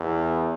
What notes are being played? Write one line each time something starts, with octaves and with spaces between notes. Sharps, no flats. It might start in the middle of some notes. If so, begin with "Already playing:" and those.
Already playing: E2